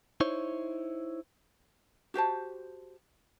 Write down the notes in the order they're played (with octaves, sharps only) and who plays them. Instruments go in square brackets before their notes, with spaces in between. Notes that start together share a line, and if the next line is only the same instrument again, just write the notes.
[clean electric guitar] D#4 E4 C5 C#5
[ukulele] F#4 G4 C5 A5